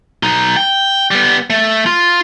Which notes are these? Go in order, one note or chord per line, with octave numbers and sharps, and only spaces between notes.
B1 D#4
G5
G3 B3
A3
F4